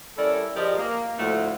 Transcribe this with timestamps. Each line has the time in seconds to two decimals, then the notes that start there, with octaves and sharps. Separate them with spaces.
0.17 G3 C#4 E4 A4 A#4 D5
0.56 F3 G4 G#4 A#4 D5 D#5
0.78 A#3
1.19 D2 A2 F3 A3 F#4